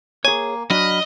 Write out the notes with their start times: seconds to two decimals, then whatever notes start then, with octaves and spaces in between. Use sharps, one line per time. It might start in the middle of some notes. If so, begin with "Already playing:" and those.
0.25 A#3 G#4 C#5 G#5
0.70 F#3 D4 F#4 D#5 B5 F6